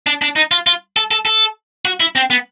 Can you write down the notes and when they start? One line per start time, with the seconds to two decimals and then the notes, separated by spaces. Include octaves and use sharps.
0.07 D4
0.22 D4
0.36 D#4
0.51 F4
0.67 F4
0.97 A4
1.11 A4
1.25 A4
1.85 F#4
2.00 E4
2.16 C4
2.30 B3